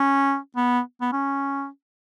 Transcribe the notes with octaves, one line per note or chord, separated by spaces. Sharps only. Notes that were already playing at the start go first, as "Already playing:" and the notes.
Already playing: C#4
B3
B3
C#4